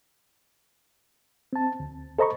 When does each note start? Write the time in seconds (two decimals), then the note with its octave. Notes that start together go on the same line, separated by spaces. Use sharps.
1.53 C4 A5
1.80 D2
2.19 A4 C5 D#5 A#5 B5 C#6